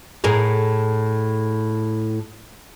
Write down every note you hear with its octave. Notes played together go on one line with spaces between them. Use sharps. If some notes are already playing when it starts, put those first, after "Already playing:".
A2 G#4 A#4